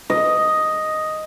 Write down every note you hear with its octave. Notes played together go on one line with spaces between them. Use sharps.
D#5